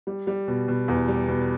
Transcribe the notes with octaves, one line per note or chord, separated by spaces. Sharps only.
G3
G3
B2
B2
E2
G3
B2